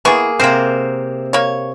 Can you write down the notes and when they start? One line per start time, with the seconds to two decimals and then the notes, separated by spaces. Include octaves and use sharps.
0.05 E3 A#3 B3 G#4 C#6
0.40 C3 A#3 C4 A#4 C5
1.33 A#3 C#5